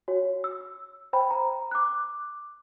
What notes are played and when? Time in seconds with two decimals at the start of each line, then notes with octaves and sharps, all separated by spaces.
0.08 F#4 C#5
0.44 E6
1.13 C5 G5 B5
1.31 A#5
1.71 D6 F#6